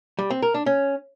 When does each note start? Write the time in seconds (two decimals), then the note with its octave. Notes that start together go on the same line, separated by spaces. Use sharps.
0.19 G3
0.31 C4
0.42 A#4
0.54 D4
0.66 C#4